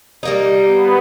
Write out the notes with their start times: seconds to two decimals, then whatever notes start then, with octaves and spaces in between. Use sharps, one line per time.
0.23 G3 A#3 D#4
0.68 B3